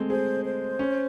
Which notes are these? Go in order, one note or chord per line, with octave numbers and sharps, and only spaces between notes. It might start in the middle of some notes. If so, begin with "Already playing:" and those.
Already playing: G#3 A3 C4
G#4 C5
C5
C#4